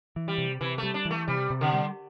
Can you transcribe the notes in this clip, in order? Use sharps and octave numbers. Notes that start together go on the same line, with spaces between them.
E3
G3
C3
C3 E3
G3 A3
D4
E3
A3
C3 G3
C3
D3
G3